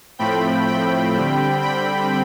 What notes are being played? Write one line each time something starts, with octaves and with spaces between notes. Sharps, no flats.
A2 F3 A3 C4 G5 B5
G5 B5
D3 G3 C4
G5 B5